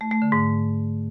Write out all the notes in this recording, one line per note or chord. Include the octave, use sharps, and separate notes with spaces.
A3
A3
D3
G#2